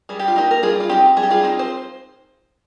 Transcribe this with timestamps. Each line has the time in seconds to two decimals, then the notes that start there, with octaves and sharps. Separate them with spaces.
0.09 G3 G#4
0.19 G4
0.28 F4
0.36 A#3 D#4 G4
0.51 A#4
0.63 G3 F4 G#4
0.80 F4
0.89 C4 D#4 G4
1.17 G3 G#4
1.23 G4
1.31 F4 G#4
1.43 C4 D#4
1.59 C5